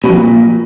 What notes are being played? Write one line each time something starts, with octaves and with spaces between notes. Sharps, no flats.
B2
F2
A#2